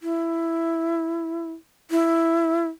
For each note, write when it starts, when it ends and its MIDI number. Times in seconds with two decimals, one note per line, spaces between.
0.01 1.52 64
1.91 2.67 64